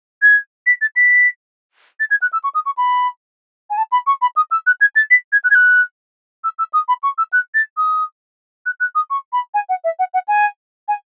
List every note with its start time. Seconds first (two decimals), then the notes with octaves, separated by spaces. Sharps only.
0.22 G#6
0.66 B6
0.81 A6
0.96 B6
1.99 A6
2.10 G#6
2.21 F#6
2.32 E6
2.43 C#6
2.54 D#6
2.65 C#6
2.77 B5
3.70 G#5
3.77 A5
3.91 B5
4.06 C#6
4.21 B5
4.36 D#6
4.51 E6
4.66 F#6
4.80 G#6
4.95 A6
5.10 B6
5.32 G#6
5.44 F#6
5.50 G#6
5.54 F#6
6.44 E6
6.58 E6
6.73 D#6
6.88 B5
7.03 C#6
7.18 E6
7.32 F#6
7.54 A6
7.77 D#6
8.65 F#6
8.80 F#6
8.95 D#6
9.10 C#6
9.32 B5
9.54 G#5
9.69 F#5
9.84 E5
9.99 F#5
10.13 F#5
10.28 G#5
10.88 G#5